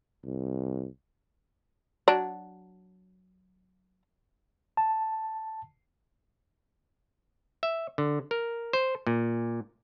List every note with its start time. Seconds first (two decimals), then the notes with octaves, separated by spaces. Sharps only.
0.25 C2
2.08 F#3 D4
4.77 A5
7.63 E5
7.98 D3
8.31 A#4
8.73 C5
9.07 A#2